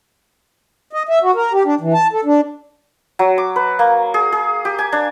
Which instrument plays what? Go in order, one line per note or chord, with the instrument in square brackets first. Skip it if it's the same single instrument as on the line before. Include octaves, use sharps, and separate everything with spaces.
[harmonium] D#5
E5
F#4
A#4
G4
D4
E3
A5
A4
D4
[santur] F#3
D6
B4
A#3
G#4
G#4
G4
G#5
D4